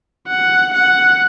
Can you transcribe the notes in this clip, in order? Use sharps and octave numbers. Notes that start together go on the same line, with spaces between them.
F#5
F#5